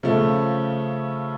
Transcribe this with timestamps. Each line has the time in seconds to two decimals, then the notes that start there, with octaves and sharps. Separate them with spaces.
0.03 C#3 F3 A3